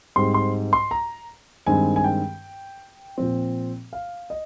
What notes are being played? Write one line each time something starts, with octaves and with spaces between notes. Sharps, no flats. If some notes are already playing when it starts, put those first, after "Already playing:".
G#2 G3 C4 C6
C6
C6
A#5
G2 D#3 G#3 C4 G#5
G#5
G5
A#2 F3 C4
F5
D#5